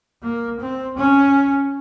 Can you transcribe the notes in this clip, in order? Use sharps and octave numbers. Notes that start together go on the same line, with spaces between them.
A#3
C4
C#4